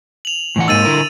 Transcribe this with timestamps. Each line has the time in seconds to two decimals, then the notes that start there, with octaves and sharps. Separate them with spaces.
0.25 F7 F#7
0.56 A2 E3 F#5
0.68 G#2 A#3 D#4 E6 A6 D#7
0.85 D3 E4 A#4